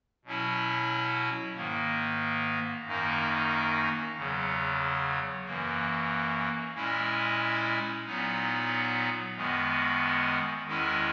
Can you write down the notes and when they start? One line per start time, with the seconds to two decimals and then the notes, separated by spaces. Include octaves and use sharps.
0.25 B2 F#3 C#4 E4
1.55 G#2 D#3 A#3
2.85 F#2 D#3 A#3 D#4
4.15 E2 C#3 F#3
5.44 F#2 E3 A#3
6.75 A#2 G#3 C#4 E4
8.05 A#2 F#3 B3 D#4
9.35 F#2 D#3 G#3 B3
10.65 E2 D#3 G#3 C#4 E4